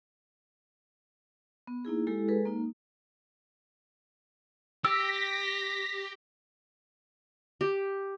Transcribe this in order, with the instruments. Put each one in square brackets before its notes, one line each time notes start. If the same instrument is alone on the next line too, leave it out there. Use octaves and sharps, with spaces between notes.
[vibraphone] B3
A#3 D#4 E4 G#4
G#3 E4 G4 A4
G#3 G#4 A4 B4
A#3 D#4
[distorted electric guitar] G4 [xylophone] E6 [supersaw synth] A#6 B6
[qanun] G4